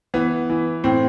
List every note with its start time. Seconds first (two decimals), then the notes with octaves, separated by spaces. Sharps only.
0.14 E3 B3
0.50 E3
0.84 A2 C4